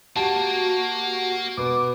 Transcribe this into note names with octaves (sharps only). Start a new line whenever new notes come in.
A#3 F#4 G4 A5
B2 B3 D6